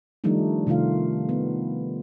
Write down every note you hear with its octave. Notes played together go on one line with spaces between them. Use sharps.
D#3 F3 G3 A3 D4 D#4
C3 D#3 A3 F4 F5
B3